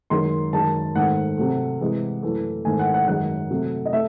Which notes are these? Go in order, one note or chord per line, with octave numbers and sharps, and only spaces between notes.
F#2 D#3 G#3 C6
F#2 D#3 G#3 A5
G#2 D#3 A3 F#5
C3 F#3 A3
C3 E3 G#3
F#2 E3 A3
G#2 D#3 A3 G#5
F#5
F#5
F#2 D#3 G#3 F#5
C3 F#3 A3
D#5
A3 E5